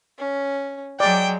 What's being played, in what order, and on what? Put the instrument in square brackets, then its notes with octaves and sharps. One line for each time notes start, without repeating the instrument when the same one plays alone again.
[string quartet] C#4
[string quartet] F#3 G#3 [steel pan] D5 [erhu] G5